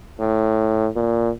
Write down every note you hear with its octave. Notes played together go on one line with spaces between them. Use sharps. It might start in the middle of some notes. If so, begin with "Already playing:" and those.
A2
A#2